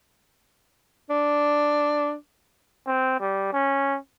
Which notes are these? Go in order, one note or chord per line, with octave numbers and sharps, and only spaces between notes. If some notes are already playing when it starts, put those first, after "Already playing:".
D4
C4
G3
C#4